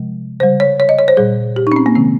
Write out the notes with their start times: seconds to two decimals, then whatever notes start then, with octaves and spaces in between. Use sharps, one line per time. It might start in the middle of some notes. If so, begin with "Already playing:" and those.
Already playing: C3 F3 G#3
0.40 C#3 G3 C5
0.60 C#5
0.80 C#5
0.89 D#5
0.99 C#5
1.08 C5
1.17 A#2 G3 G#4
1.56 G4
1.67 D#4
1.72 C#4
1.76 C4
1.86 A#3
1.96 C3 D#3 G#3 C4